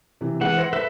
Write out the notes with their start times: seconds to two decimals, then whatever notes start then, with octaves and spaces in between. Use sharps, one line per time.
0.21 C3 E3
0.41 E3 G#3 F#5
0.57 C5 A#6 C#7
0.73 A4 B4 E5 F#6